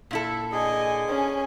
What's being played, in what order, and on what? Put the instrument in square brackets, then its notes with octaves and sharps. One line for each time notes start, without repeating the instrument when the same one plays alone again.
[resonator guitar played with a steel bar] A#2 E4 A4
[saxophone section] D3 A#3 G#4 [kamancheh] D#5 G#5
[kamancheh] C#4 G#5